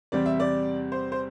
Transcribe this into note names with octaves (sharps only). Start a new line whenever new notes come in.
E2 C3 G3 C4 D5
E5
D5
C5
C5